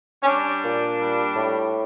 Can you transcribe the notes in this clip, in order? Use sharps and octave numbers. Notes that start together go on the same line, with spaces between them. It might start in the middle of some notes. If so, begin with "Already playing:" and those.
C#4
G3 D4
A#2
G3
A2